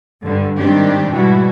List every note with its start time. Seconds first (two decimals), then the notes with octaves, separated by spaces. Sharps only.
0.23 G2 D3 G3
0.58 G#2 D#3 G3 C4 D4 G4
1.12 G#2 B2 E3 G3 E4 F#4